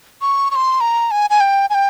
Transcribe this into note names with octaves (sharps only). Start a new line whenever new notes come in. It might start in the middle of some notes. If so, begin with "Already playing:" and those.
C#6
C#6
C6
A#5
G#5
G#5
G5
G#5
G5